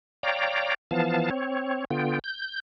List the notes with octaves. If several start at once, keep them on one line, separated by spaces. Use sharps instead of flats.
C#5 D5 F5 G5 A#5
E3 F3 B3 F5 A5
C4 C#5
D3 B3 F4 G5
G6